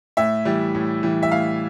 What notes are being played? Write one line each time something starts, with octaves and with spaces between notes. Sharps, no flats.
A2 E5
E3 G3
A2
E3 G3
E5
A2 F5